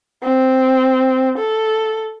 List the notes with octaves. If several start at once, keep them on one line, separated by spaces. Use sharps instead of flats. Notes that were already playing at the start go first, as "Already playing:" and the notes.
C4
A4